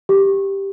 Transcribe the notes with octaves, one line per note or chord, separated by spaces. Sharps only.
G4